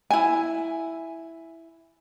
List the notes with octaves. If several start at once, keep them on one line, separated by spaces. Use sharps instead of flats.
E4 G#5